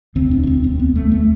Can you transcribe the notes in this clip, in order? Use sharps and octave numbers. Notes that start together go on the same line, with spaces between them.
E1 D2 D3 C4
D4
D4
C4
C4
B3
A3
A3